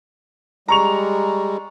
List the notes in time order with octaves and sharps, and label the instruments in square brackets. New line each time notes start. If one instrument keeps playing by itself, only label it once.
[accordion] G3 G#3 [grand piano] A#5 C#6 F7